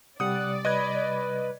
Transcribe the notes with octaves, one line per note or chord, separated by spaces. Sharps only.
C3 G3 D5 F#5 D#6
B4 D#5 G#6